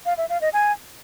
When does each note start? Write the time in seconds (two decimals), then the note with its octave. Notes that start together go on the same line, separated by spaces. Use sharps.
0.06 F5
0.17 E5
0.29 F5
0.41 D#5
0.53 G#5